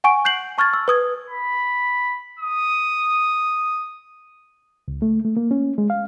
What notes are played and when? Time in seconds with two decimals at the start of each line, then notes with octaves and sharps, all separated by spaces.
0.04 F#5 G#5 C#6 D7
0.25 F#6 G6 C7 F#7
0.58 A5 C#6 F6 G#6 A6
0.73 E6
0.88 B4 D#6 G#6
1.30 B5
2.39 D#6
4.88 C#2
5.02 A3
5.25 A3
5.37 A#3
5.51 C#4
5.78 G#3
5.90 F5